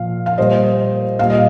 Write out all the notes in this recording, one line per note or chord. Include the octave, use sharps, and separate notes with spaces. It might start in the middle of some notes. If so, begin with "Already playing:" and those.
Already playing: A#2 F3 F5
F5
A#2 G3 C5 D#5
A#2 G3 F5
D#5